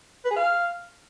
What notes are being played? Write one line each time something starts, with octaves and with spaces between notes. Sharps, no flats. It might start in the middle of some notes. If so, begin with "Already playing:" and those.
B4
G#4
F5